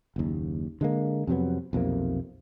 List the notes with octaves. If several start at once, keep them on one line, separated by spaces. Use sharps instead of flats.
F#1 D#2
D3 G#3 A#3
F2 C3 F#3 B3
B1 F2 C3 A#3